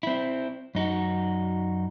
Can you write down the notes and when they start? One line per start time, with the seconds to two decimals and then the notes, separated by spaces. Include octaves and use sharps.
0.03 C4 E4
0.75 F#2 D#4 F#4